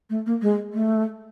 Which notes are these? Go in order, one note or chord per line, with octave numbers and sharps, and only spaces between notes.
A3
A#3
G#3
A3